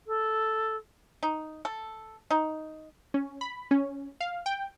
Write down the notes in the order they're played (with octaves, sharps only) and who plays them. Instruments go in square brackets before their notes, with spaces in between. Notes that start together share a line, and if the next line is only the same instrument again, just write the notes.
[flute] A4
[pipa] D#4
A4
D#4
[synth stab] C#4
B5
C#4
F5
G5